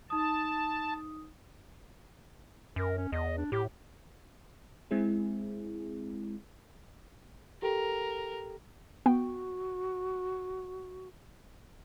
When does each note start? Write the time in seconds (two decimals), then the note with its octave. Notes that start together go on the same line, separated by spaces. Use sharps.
0.10 D#4 A5 D#6
2.76 F#2 A#4
2.97 C#4
3.12 E2 D#5
3.38 D4
3.52 A2 G4
4.91 G#3 C4 E4 G#4
7.62 G4 A4 A#4 G5
9.06 B3 F#4 G5